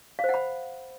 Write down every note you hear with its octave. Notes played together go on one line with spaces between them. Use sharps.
F5
C5
F#5
B5